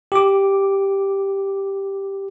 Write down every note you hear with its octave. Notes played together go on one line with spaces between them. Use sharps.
G4 D6